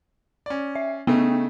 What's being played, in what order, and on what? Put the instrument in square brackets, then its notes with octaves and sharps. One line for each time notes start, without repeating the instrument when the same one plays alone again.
[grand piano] C#4 D5
[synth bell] E5
[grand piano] C#3 A3 D#4 [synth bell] B3